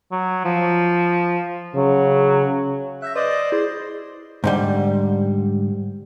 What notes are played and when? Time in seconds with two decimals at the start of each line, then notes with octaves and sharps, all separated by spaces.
0.12 F#3
0.45 F3
1.75 C#3 F#3
3.02 E5 F#6 G6 A#6
3.15 B4 C5 D5 D#5
3.31 A6
3.52 E4 G#4 C5 D5
4.44 G#2 D3 G3